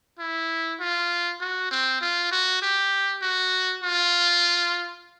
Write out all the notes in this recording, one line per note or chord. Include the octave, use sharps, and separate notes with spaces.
E4
F4
F#4
C4
F4
F#4
G4
F#4
F4